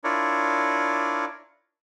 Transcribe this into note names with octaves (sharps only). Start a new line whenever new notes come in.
D4 E4 F4 A#4 C#5 D5